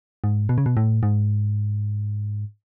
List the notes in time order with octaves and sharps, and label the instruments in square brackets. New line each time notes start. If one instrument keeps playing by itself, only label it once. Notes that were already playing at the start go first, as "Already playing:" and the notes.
[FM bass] G#2
B2
C#3
B2
A2
G#2